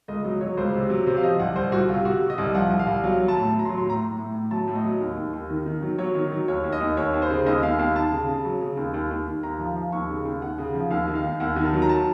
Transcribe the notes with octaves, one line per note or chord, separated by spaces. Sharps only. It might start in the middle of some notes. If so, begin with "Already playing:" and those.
C#2 D#5
F#3 D#5
F#3 C#5
C#2 C5
C3
F#3
C3 C5
F5
F3 D#5
C2 F#5
C2 C5
C2 F#4
C3 F4
C3 F#4
C3
D#5
C2
F3 F#5
C2
F5
C2
F#3 F5
F#3
A5
A2
F#3
A#5
C6
F#3
C6
A2 A#5
A2
A2
A2
F#3 A5
A2
D#5
F#3
D#2
D#2
D#2
D#3
D#3
F#3
F#3 C#5
D#3
F#3
D#2 C#5
D#2
D#5
D#2
D#2 C#5
D#2
C5
C#3
D#2 D#5
D#2 F5
D#2 F5
D#2 A5
C#3
C#3
F#3
C#3
D#2
D#2
D#2
D#2
D#2 A#5
F3
F3
D#2 C#6
C#3
D#2
D#2 F#5
C#3
F3
D#2 F5
D#3
F5
D#2
D#2 F#5
D#3
A5
F#3
A#5
A5